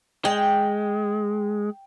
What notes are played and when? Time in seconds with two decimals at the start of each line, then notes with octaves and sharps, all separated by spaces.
0.25 G#3 G5